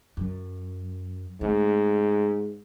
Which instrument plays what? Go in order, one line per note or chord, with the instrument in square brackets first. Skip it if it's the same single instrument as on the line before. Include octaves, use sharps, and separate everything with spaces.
[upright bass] F#2
[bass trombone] G#2 [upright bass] A3 C4